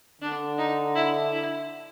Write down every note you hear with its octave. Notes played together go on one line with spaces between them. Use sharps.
D3 D4
D#4
E4
E4